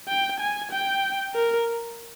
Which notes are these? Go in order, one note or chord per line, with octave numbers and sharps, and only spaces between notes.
G5
G#5
G5
A#4